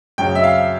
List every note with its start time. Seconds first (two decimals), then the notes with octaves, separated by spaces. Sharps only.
0.18 F#2 C#3 F#3 G5
0.35 E5
0.44 F5